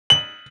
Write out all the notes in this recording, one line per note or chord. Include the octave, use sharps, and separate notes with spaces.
F#7